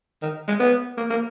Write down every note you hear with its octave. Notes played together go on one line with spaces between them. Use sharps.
D#3
G#3
B3
A#3
A#3